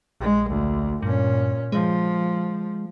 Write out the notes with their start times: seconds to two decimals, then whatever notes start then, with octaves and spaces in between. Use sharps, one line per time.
0.21 A#1 G#3
0.50 D2
1.02 G2 A#2 C#4
1.72 F3 G#3